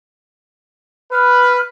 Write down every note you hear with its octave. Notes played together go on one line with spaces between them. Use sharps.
B4 F6